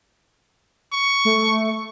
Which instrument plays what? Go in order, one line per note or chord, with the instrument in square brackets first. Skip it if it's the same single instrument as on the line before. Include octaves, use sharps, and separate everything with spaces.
[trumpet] C#6
[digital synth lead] A3